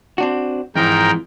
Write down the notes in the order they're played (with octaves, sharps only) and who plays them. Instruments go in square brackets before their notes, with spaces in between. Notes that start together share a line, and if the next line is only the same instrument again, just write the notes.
[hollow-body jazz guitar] C4 D4 F#4
[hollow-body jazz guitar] F2 E3 [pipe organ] G#2 A#4 G5